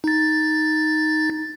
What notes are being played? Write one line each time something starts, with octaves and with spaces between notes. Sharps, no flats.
D#4 A6